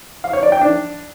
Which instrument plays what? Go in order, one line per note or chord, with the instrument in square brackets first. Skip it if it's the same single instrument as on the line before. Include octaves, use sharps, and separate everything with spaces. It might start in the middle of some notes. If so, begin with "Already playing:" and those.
[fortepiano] F5
C#5
D5
G5
D4